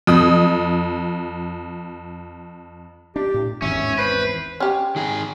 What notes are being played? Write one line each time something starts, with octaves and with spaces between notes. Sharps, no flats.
F2 D#6
D4 G4
A2
G#1 E2 C#4 E5
B4 C5
C#4 G4
D#3 G#4